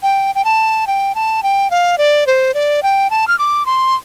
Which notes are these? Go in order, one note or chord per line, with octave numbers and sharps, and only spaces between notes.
G5
G5
A5
G5
A5
G5
F5
D5
C5
D5
G5
A5
F6
D6
C6